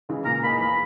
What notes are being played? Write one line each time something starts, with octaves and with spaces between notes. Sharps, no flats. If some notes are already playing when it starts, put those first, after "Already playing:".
C#3 E3 G#3
A#2 A#5
A#3 D#4 G#4 B5
E2 B5